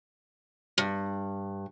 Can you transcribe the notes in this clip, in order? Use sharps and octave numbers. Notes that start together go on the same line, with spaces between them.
G2